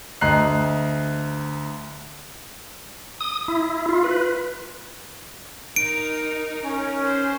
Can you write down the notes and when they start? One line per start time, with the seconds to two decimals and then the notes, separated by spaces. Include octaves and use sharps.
0.21 D2 D#5 A#5 F#6 C7
3.20 D#6
3.48 E4
3.89 F4
4.04 B4
5.76 D#4 A#4 D7
6.64 C#4
7.05 C5